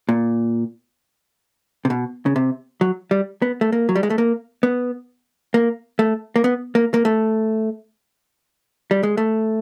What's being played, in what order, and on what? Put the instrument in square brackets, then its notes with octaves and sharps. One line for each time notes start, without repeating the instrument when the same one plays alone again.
[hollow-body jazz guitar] A#2
C3
B2
C#3
C3
F#3
G3
B3
A3
A#3
F#3
G3
G#3
A3
A#3
B3
A#3
A3
A#3
B3
A#3
A#3
A3
G3
G#3
A3